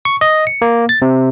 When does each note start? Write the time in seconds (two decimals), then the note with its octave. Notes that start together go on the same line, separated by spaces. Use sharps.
0.05 C#6
0.21 D#5
0.47 C#7
0.62 A#3
0.89 A6
1.02 C3